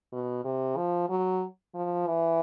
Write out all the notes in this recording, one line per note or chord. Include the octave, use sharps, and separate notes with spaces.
B2
C3
F3
F#3
F3
E3